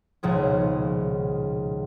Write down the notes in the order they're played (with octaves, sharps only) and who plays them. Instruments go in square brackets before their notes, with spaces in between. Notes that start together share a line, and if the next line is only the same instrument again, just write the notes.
[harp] D#1 C#2 B2 F3 G#4